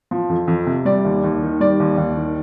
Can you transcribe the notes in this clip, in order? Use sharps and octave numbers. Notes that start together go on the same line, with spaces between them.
F3
F2
F2
C3
G3 D5
D#2
D#2
D#3
G3 D5
D#2
D#2
D#3